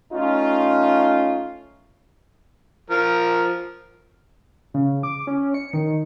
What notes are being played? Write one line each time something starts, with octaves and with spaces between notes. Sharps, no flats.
A3 C#4 D#4 F4
F3 A#4
C#3
D6
C#4
C#7
D#3